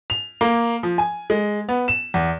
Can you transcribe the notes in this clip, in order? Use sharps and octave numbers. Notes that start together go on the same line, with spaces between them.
F7
A#3
F3
G#5
G#3
B3
E7
E2